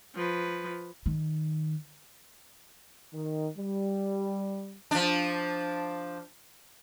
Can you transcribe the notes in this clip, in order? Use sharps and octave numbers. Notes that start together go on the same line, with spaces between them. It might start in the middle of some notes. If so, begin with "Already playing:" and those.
F3 B4
D#3
D#3
G3
F3 D4